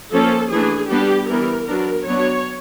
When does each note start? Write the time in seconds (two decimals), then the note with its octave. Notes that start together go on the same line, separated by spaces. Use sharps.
0.13 F3 A#3 C#4 A4
0.52 E3 A3 D4 G#4
0.90 G3 B3 D4 G4
1.29 E3 G3 B3 A#4
1.67 F#3 B3 D4 A#4
2.07 F#3 B3 D4 C#5